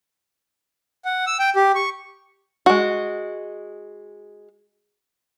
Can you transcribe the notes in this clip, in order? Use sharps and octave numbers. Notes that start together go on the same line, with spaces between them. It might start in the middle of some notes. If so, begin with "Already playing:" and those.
F#5
E6
G5
G4
C#6
G#3 F#4